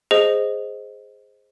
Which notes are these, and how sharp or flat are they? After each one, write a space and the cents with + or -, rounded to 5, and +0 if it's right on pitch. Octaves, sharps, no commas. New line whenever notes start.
G#4 +0 C5 +0 D#5 +0